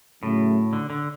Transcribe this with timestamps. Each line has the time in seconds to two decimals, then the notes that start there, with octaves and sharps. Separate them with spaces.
0.23 A2 C#3 F#3 A3
0.73 D3
0.90 D3